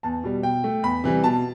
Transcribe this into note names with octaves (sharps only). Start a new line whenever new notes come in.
E2 A5
B2 G3
B2 G5
A3
E2 B5
C3 E3 G3
B2 A5